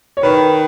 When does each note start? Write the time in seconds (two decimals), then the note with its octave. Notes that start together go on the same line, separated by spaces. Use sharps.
0.17 C#5
0.22 D#3 B4